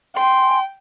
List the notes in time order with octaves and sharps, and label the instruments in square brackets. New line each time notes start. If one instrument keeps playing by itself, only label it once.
[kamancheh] G5 [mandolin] G#5 C6